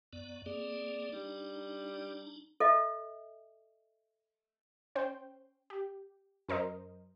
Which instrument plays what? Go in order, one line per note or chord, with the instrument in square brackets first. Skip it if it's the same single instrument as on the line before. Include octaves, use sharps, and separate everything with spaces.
[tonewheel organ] F#2 B3 D5
[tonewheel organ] A#3 C4 G#4 [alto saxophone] D5
[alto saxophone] G3 [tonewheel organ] D4 D#4
[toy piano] A4 D#5 E5
[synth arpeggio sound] C#4 C5 G5
G4
F#2 A#4 C5 D#5